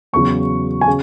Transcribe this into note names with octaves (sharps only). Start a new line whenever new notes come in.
E2 C#3 F#3 C#6
G#5
C#3